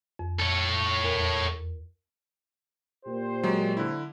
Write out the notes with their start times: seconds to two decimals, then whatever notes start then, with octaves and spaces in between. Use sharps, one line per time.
0.19 F2
0.40 A4 C#5
1.04 E2 A#4
3.06 A#2 G4 C5
3.43 F#3 G#3
3.77 D3 E4